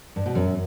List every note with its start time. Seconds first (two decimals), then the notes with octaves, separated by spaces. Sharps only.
0.16 G2
0.26 B2
0.35 F#2